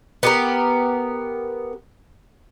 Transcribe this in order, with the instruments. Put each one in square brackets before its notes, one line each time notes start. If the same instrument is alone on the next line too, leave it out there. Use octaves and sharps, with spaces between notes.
[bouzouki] B3 G4 A#4